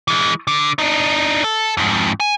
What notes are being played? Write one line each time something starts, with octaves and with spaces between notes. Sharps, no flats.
E3 G#3
D3
D4 D#4
A4
F2 G#2
G#5